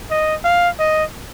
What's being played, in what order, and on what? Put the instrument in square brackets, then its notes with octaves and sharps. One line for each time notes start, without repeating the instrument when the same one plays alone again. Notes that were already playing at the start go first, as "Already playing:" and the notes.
[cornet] D#5
F5
D#5